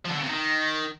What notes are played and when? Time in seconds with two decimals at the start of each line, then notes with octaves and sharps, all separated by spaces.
0.06 F3
0.11 D3
0.17 C#3
0.23 C3
0.29 D#3